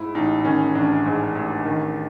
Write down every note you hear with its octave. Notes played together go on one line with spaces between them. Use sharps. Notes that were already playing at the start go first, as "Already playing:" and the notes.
Already playing: G#2 E4
A1 D#4
D#3 C#4
A1 D4
G#2
A1
D#3